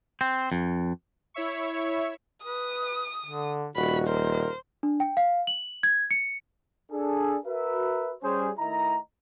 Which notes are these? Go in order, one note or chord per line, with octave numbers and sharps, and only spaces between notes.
C4
F2
E4 C#5 E5 C#6
B4 D#6
D3
D#1 F#4 B5
A#4 C5
D4
G5
F5
F#7
G#6
C#7
D4 G#4 A4
F#4 A#4 B4 E5
G3 C#4 G#4 C5
D#3 A3 E4 D#5 A#5